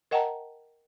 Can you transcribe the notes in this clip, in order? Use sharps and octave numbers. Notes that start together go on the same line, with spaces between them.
A#4 D#5 F#5 G5 A5 A#5